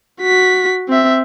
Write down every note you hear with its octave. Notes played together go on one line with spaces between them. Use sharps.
F#4 B6
C4 E5